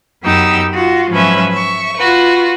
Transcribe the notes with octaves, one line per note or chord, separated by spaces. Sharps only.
F#2 B3 D#4 G4 E6
F4 F#4
G#2 F3 F#3 C#4 B4 E5
E5 C#6
F4 F#4 B4